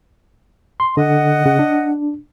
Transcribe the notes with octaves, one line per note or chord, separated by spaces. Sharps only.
C6
D3 D#5 F#5
C#3
D4